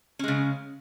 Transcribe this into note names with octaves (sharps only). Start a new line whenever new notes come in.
C#3 G#3 C#4